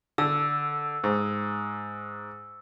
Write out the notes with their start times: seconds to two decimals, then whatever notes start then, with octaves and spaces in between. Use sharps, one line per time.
0.18 D3 E6
1.04 G#2